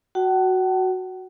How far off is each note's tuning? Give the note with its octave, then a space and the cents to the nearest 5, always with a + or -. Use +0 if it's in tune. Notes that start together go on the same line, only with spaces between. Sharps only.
F#4 +0 F#5 +45 A5 +0